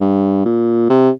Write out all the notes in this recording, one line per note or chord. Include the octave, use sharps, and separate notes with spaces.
G2
A#2
C3